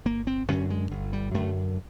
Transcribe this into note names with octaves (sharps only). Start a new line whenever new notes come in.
G1 A#3
C4
F#2 D3 C#4
G#3
G1
G3
F#2 D3 A3